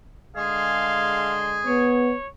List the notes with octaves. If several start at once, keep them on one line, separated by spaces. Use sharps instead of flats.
D3 G#3 G#4 F5 C6
B3 C#5